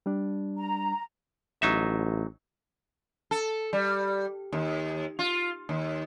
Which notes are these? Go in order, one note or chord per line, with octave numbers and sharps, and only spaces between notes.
G3 D4
A#5
A1 F#3 D#4 E5
A4
G3
D#2
F4
D#2